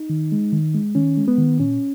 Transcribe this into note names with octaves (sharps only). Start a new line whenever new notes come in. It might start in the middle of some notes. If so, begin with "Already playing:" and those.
Already playing: D#4
D#3
G#3
D#3
G#3
D#3 C#4
G#3
B3
D#3
A#2 C#4